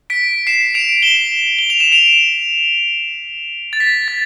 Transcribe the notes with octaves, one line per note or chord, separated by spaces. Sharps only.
B6 D7
C7 E7
D7 F7
E7 G7
G7
F7
E7
D7 F7
A6
B6
A6